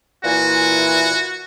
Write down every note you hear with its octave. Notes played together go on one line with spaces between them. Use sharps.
A#2 E3 F#4 G#5